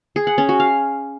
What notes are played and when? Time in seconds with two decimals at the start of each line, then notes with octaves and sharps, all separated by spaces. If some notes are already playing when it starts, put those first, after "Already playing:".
0.16 G#4
0.27 F#5
0.38 C#4
0.49 F#4
0.60 F5